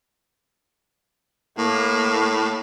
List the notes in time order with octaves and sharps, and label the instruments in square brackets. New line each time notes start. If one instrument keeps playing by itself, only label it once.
[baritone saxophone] A2 [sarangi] A#3